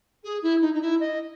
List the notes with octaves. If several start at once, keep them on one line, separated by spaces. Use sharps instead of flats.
G#4
E4
D#4
D#4
E4
D#5